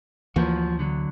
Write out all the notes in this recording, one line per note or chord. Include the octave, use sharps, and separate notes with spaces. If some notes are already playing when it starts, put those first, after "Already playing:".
D2 E3 F3 A#3 F#4
D3 F#3